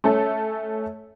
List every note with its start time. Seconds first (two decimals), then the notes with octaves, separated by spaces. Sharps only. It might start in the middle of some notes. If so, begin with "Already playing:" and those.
0.04 A3 C#4 A4